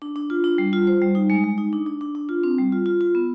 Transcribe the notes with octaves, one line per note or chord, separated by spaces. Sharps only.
D4
D4
F4
D4
G3
F4
C5
G3
D#4
G#3
G#3
D#4
D4
D4
D4
D4
F4
C4
G3
F4
F4
F4
B3